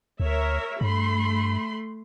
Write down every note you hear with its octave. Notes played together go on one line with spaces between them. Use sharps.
D2 A#4 C#5 E5
G2 A3 B5 C6